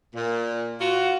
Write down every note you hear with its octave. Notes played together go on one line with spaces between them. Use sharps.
A#2
F4 F#4